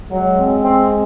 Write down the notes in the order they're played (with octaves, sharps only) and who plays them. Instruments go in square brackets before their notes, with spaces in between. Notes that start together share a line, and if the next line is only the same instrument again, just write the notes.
[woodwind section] F#3 [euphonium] G#3
[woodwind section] C4
C4
C4